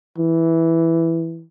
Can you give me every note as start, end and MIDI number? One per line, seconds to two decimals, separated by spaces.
0.18 1.44 52